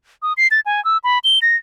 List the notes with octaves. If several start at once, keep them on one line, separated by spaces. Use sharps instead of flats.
D#6
C7
A6
G#5
E6
B5
G7
A#6